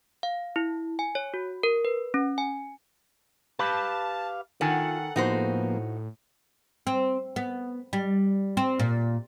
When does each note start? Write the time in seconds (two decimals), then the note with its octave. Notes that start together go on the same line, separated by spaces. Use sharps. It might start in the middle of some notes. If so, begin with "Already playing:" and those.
0.23 F5
0.56 E4
0.99 G#5
1.15 C#5
1.34 F#4
1.63 A#4
1.85 B4
2.14 C#4
2.38 G#5
3.59 G4 B4 F5 A5 B5
4.61 D#3 F4 A4 F#5 G#5
5.16 A2 F3 A#3 B3 D#4 F#4 C5
6.87 C4
7.36 B3
7.93 G3
8.57 C4
8.79 A#2